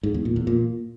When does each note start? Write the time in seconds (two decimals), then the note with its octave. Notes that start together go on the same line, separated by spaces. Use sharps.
0.03 G#2
0.14 E2
0.25 A#2
0.36 E2
0.47 A#2